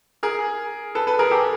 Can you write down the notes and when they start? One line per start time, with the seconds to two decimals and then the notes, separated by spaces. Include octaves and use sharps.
0.23 G#4 A#4
0.95 A4 B4
1.07 A4 B4
1.19 G#4 A#4
1.31 G4 A4